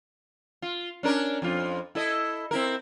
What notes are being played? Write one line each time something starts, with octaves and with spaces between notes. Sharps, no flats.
F4
C#4 D4 A#4
F2 F4
E4 A4 D#5
C4 E4 A#4